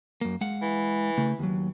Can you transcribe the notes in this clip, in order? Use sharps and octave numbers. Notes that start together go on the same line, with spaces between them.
F#2 A#3
G#3 F5 F#5
E3
C#3 A3
D#2 F#3